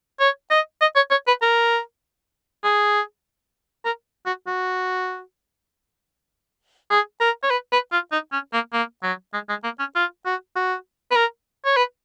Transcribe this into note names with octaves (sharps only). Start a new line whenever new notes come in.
C#5
D#5
D#5
C#5
C#5
B4
A#4
G#4
A#4
F#4
F#4
G#4
A#4
C#5
B4
B4
F4
D#4
C#4
A#3
A#3
F#3
G#3
G#3
A#3
C#4
F4
F#4
F#4
B4
A#4
C#5
B4